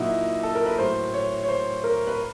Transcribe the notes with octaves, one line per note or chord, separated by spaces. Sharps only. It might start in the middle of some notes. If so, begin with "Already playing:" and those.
Already playing: A#2 F#3 D#4 E4 F#4
A4
A#4
B4
A2 F#3 C5
C#5
C#5
C5
A#4
B4